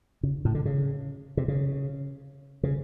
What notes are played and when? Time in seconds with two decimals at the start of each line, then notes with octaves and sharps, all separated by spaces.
0.23 C#3
0.45 A2
0.55 D3
0.66 C#3
1.37 C3
1.48 C#3
2.63 C#3